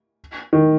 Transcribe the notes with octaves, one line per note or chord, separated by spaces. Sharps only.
D#3